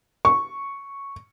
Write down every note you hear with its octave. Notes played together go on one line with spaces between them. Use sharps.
C#6